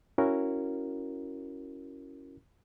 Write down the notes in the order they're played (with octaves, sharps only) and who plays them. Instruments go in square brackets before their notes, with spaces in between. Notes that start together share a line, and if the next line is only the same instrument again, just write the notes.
[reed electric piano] C#4 E4 F#4 A#4